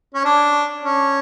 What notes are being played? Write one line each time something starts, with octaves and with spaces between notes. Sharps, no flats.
C#4
D4
C#4